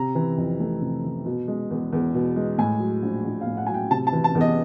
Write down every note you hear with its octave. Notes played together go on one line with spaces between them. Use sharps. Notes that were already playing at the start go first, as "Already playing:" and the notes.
Already playing: C3 A#5
E3
F2
A3
C3
E3
B2
G#3
E2
E2
B2
G#3
A2 G#5
F#3
A#1
A#1
F5
A2
F#5
F#3 G#5
G5
C3 A5
A5
E3
A5
E2
D#5